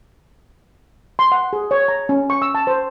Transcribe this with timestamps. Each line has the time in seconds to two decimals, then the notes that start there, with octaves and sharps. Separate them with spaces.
1.19 C6
1.32 F#5
1.53 G#4
1.71 C#5
1.88 A#5
2.09 C#4
2.30 C#6
2.42 E6
2.55 A5
2.67 C5